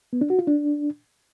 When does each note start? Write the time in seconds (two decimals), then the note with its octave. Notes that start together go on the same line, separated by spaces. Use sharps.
0.13 B3
0.21 D4
0.30 F#4
0.39 F4
0.47 D4